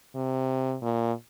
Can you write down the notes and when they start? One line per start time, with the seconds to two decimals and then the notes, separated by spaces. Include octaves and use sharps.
0.16 C3
0.82 A#2